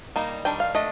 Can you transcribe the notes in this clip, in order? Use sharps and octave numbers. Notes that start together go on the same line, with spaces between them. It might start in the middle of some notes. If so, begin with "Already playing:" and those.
G3 A#3 D#4
D#3 G3 D4 G5
F5
A3 D4 D#5